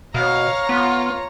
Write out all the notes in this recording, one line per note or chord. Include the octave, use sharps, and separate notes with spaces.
B2 C#5 F5 A#5
B3 F4